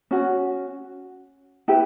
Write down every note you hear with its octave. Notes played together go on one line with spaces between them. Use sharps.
C#4 F#4
E4 G4 B4 G5